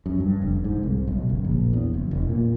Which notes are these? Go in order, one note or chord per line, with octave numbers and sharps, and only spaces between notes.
F#2
G2
F1
G#2
C2
B1
F#1
A#1
E2
F#1
E1
A#2